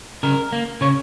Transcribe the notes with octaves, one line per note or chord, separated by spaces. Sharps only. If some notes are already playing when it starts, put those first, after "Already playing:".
C#3 A#4
A#3
C#3 C#5